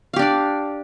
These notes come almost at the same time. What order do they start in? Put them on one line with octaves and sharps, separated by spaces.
F5 G4 D4 D5